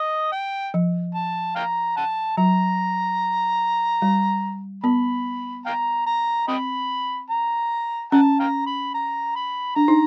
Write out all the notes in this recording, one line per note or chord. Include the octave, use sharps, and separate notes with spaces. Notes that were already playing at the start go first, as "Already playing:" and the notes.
Already playing: D#5
G5
F3
A5
F5 G5 A#5
F#5 A5
F#3 A#5
G3
B3 B5
F5 G5 A#5
A#5
C4 D#5 G5 B5
A#5
C#4 F#5 A5
F5 G5 A#5
B5
A#5
B5
D4 A#5
D#4